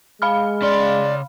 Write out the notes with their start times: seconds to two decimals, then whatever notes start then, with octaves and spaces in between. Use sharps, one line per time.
0.22 G#3 F5 B5 F6
0.62 C#3 D5 C6